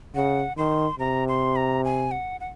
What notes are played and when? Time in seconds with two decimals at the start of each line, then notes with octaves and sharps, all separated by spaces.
0.15 C#3 F#5
0.57 D#3 C6
0.99 C3 A#5
1.28 C6
1.56 A#5
1.84 G#5
2.11 F#5
2.40 F#5